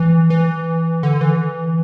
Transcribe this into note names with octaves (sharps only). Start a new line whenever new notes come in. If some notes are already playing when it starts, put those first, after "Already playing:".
Already playing: E3
E3
D3
E3